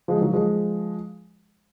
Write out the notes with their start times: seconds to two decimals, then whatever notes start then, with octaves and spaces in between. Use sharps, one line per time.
0.08 F3 G#3
0.21 D#3 F#3
0.33 F3 G#3